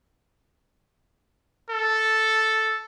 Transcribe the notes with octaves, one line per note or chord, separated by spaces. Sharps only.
A4